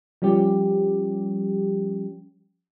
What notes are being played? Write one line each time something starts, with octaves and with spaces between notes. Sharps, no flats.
F3 G3 C#4 G4